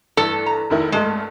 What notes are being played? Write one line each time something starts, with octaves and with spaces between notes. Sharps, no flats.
G2 E3 A4
A#5
F1 D#3 E4
C2 G2 G#3 A3